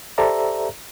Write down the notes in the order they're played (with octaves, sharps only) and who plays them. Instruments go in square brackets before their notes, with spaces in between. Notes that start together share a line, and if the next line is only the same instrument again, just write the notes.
[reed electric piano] G4 A4 C5 D5 E5 A#5